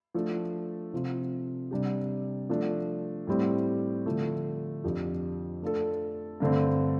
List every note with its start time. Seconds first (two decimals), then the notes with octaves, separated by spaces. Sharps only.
0.15 F3 A3 D4 A4
0.93 C3 F3 C4 F4
1.71 C3 G3 D4 G4
2.49 F3 A3 D4
3.27 A2 G3 C4 G4
4.06 D3 F3 A3
4.84 F2 F3 D4 G4
5.62 A3 D4 F4 A4
6.40 G2 D3 A3 C4